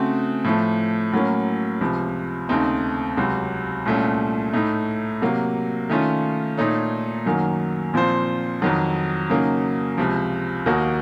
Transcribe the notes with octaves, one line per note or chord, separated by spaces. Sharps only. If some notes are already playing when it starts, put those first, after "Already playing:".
Already playing: C#3 A3 C4 F#4
A2 F3 A3
A2 F#3 A#3 C#4
C#2 C3 F3
D#2 C#3 A3 C4 D#4
C#2 C3 F#3 C4
C2 A#2 A3 C#4
A2 A3 D#4
C3 F#3 A#3
D#3 A3 C#4 F4
A#2 A3 D#4 A4 C#5
F#2 D#3 F#3 A#3
A#2 F3 C4 F4 C5
F2 D#3 F#3
C#3 F#3 A#3 D#4
C#2 C3 F3
D#2 D#3 A#3 D#4 F#4